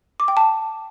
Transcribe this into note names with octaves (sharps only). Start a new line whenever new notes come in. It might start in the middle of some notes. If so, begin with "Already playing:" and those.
D6
G5
A5